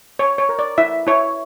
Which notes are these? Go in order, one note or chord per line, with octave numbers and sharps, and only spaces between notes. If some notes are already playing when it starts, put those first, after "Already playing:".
C#5
C#5
A#4
D5
E4 E5
E4 C#5